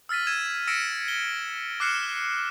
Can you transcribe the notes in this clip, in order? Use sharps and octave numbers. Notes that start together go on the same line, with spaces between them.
E6 F6 A6 B6 D#7
E6 G#6 D#7 E7
E6 A#6 B6 C#7 D7 E7
G7
D6 F6 F#6 C7 C#7 E7